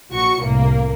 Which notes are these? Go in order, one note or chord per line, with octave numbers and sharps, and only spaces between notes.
A#1 F#4 C#6 C#7
C2 A2 A#3